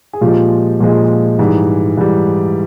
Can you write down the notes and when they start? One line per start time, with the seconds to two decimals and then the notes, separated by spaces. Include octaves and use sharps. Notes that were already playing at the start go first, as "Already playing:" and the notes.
0.13 G#4
0.21 A#2 F3 G#3 F4 G4
0.80 A#2 F3 G#3
1.39 G#2 E3 G3
1.97 G#2 E3 G3